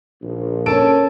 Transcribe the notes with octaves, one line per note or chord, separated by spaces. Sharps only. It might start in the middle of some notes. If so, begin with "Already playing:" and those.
A#1
C#4 A4 A#4 A5 D7